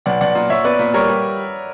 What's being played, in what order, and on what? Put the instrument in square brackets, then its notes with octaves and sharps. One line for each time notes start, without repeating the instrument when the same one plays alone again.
[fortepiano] B1 [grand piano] D5 F#5
[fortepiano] B1 [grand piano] D5 F#5
[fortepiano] A#2
[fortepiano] A#2 [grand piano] C#5 E5
[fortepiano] B3 [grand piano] B4 D5
[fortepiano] A#2
[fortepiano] G3 [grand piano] A#4 C#5
[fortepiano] G3